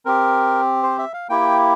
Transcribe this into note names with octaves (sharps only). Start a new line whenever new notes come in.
C4 G4 A#4
C5
E5
F5
A#3 E4 G4 G5